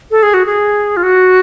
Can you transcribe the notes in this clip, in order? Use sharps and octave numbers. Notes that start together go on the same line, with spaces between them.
A4
G#4
F#4
G#4
F4
F#4